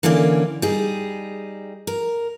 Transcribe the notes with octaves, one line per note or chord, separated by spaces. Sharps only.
D3 E3 A#3 C#4 D5
G3 D#4 G#4
A#4